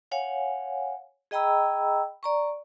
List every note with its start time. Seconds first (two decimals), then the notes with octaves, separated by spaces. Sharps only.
0.11 C#5 F5 F#5 G#5
1.31 G#4 D#5 G5 A#5 B5 E6
2.23 D5 A#5 C#6